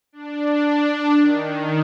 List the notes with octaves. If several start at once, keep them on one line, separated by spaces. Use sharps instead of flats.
D4
D#3